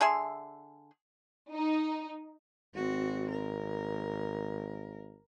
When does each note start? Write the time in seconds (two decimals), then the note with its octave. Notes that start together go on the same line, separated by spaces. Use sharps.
0.01 D3 G#4 E5 C6
1.53 D#4
2.75 G#1 C4 F#4
3.31 A#4